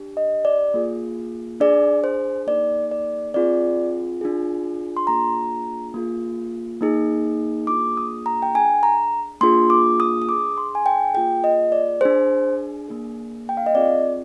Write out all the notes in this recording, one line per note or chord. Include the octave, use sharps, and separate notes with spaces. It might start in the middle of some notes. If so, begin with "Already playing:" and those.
Already playing: D4 G4
D#5
D5
A#3 F4 G#4
D4 G#4 D5
C5
A#3 D#4 G#4 D5
D5
C4 F4 G#4 D5
D4 F4 G#4
C6
A#3 D4 F4 G#4 A#5
A#3 F4 G#4
A#3 D#4 G#4
A#3 D4 F4 G#4 D6
D#6
A#5
G5
D4 G#4 G#5
A#5
A#3 D4 F4 G#4 C6
D6
D#6
D#6
D4 G#4 D6
C6
G#5
G5
A#3 F4 G#4 G5
D#5
D5
D4 G#4 C5
A#3 D4 G#4
G5
F5
D#5
C4 F4 G#4 D5